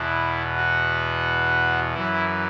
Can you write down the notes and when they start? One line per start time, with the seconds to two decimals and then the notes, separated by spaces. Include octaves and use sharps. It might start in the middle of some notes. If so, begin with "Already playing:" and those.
Already playing: E2 B2 E4
0.56 F#4
1.94 F#2 E3 E4